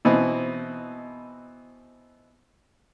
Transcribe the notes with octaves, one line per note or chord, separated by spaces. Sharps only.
B2 E3 C4 D#4